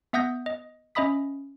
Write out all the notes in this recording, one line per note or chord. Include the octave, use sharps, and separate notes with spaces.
B3 E5 F#5 D#6 G6 A#6
D#5
C#4 D#5 E5 B5 D#6 B6